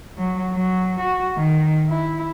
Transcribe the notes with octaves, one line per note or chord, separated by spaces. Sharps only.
F#3
F#3
F#4
D#3
E4